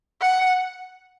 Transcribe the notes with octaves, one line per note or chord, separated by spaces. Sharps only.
F#5